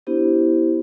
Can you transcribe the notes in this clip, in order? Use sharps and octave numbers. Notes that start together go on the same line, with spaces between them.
B3 D4 E4 G4 C5